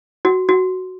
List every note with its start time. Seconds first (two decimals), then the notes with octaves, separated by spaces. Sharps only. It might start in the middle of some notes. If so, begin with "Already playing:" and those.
0.25 F#4
0.49 F#4